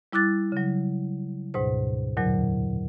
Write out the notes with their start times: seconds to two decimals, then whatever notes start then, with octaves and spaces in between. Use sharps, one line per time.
0.13 G3 E4 D6 F#6 A6
0.52 C#3 F#3
1.54 D2 G#2 B2 C5
2.17 E2 A#2 D3 F#3